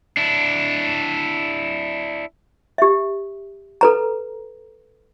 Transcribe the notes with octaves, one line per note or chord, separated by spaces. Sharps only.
D4 E4
G4 E5
A4 B4 A#5